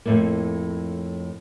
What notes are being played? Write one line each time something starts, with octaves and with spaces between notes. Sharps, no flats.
F2 A2 A#3